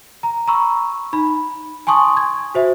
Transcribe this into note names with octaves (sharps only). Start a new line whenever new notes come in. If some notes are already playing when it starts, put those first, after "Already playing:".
A#5
A#5 B5 C#6 E6
D#4 B5
G#5 A5 C6 C#6 D#6
G#6
F#4 C5 E5